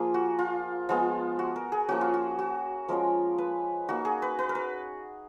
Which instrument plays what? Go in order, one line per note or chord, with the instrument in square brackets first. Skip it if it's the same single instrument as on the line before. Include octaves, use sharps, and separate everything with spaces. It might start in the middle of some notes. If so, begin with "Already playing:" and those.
Already playing: [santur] F3 A#3 F4 G#4
F#4
F4
F3 G#3 B3 F4
F#4
A#4
G#4
F3 A#3 C#4 F#4
F4
F#4
F#4
F3 G#3 C#4 F4 A#4
B4
A#3 D#4 F#4
G#4
B4
B4
A#4
B4